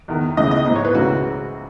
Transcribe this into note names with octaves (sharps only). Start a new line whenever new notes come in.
E2 D#3
C#2 C#3 E3 D#5
D#5
A#1 G#2 E3
C#5
B4
C#2 C#3 E3 F#4